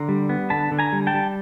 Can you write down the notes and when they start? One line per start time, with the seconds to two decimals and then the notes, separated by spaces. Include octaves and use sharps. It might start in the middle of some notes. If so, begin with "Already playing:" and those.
Already playing: D3 A#5 C6
0.09 G3
0.29 B3
0.50 D3 A5 B5
0.72 D3
0.79 G#5 A#5
0.93 G3
1.07 G5 A5
1.14 G3